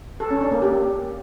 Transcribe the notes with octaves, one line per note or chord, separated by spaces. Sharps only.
A4
C#4
D4
A#3
G4